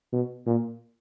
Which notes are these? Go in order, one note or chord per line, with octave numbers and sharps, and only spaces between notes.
B2
A#2